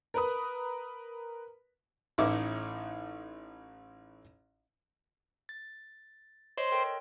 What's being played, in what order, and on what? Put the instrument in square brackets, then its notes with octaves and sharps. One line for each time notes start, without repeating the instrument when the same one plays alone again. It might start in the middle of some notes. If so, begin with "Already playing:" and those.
[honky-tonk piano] A#4 B4 D#6
[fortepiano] A1 A2 D#4 E4 D6
[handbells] A6
[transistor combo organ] C5 [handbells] C#5 D#5 C6
[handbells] A4 A#4 G5